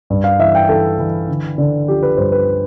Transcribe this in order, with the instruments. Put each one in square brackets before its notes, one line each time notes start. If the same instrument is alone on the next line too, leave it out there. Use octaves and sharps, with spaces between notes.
[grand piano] G2
F5
E3 E5
G5
E3 A4
E3
D3
D3
F3 G4
B4
G2 C5
B4